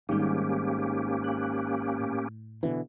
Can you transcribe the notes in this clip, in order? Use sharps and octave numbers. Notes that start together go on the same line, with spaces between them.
G#1 G#2 D#3 G3 A#3 C#4 G4
F#6
A2
B2 D3 E3